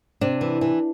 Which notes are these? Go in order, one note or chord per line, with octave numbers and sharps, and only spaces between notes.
C3 D4
E3
E3